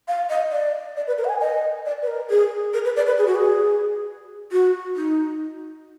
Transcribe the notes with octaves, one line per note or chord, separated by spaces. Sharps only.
F5
D#5
D5
D5
B4
A#4
F#5
G#5
D#5
D5
B4
A#4
G#4
A#4
B4
D5
B4
G#4
F#4
G#4
F#4
D#4